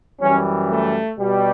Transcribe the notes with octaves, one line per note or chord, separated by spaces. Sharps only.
F#2 E3 G3 C#4
A3
B2 G3